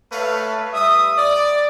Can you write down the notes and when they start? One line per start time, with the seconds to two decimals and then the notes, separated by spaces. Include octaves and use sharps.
0.11 A3 B4 C#5 F5
0.73 G3 E5 D#6
1.17 D5